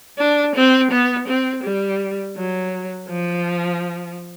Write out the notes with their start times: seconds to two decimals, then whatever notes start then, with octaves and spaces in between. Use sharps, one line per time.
0.18 D4
0.55 C4
0.91 B3
1.28 C4
1.64 G3
2.36 F#3
3.09 F3